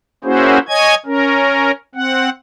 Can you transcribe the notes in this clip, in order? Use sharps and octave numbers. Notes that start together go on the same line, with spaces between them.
A#3 C#4 E4 F#4 G#4 C5
C#5 D#5 G#5 G#6
C#4 A#4
C4 F#5